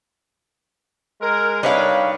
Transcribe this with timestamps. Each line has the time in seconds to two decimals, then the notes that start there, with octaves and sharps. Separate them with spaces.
1.22 G#3 A#4
1.63 G3 D4 D#4 B4 C#5 F5